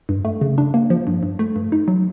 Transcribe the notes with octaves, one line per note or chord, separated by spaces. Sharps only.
G2
A3
C#3
D4
A#3
F3
G2
G2
A3
G2
D#4
F#3